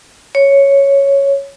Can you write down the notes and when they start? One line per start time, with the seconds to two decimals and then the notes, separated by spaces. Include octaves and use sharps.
0.35 C#5